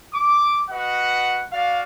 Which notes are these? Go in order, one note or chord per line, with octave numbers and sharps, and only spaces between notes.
D6
F#4 B4 D#5 F#5
F#4 D5 F5